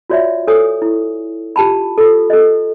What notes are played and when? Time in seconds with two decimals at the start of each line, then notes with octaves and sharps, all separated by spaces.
0.10 F4 F#4 C#5 D5 E5
0.47 A4 C#5 G#5 D#6
0.82 E4
1.56 F4 G4 A5 B5
1.98 F4 A4
2.30 A4 D#5